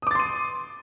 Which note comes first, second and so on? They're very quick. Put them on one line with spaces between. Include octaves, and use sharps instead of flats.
D#6 D6 A6 C6 D#7